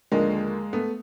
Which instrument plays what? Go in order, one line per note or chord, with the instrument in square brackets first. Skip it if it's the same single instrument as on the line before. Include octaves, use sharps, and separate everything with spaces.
[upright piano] D#2 D3 F3 G#3 A#3
A3 B3